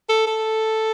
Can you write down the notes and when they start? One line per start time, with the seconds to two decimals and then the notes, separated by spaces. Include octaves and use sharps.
0.09 A4
0.27 A4